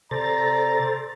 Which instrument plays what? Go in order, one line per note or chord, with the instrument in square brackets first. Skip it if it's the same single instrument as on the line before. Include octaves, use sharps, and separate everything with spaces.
[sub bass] C3 [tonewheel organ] A4 C5 A6 [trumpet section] D5 A#5